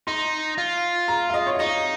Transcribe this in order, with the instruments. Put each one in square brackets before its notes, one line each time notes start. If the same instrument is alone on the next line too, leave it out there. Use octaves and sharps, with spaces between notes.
[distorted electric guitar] D#4 [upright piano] C6
[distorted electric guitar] F4
[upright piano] A#5
F5
D#5
C#5
F5
[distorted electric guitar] D#4 [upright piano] D#5